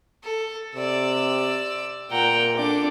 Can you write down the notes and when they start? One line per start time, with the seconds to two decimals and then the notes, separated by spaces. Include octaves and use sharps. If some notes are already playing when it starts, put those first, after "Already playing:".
0.24 A4
0.75 C3 D5 E6
2.11 A#2 F#5 G5 A#5
2.57 D4 A4 D6